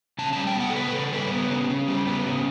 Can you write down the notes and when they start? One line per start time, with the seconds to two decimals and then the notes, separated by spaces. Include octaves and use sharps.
0.19 C#3 A5
0.33 G3 A5
0.47 G5
0.55 B3 F#5
0.70 A4
0.75 C#3 B4
0.93 C#3 A4
1.12 G3 B4
1.32 B3
1.50 C#3
1.70 C#3
1.88 G3
2.07 B3
2.26 C#3